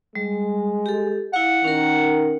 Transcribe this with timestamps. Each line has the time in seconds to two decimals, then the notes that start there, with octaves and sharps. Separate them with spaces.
0.15 G3 G#3
0.86 G4 A4
1.33 E4 F5 F#5
1.64 D#3 C#4 A#4